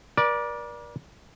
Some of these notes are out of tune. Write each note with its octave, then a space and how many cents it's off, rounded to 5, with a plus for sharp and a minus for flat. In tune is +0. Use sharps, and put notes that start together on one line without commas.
A#4 +45 D5 +0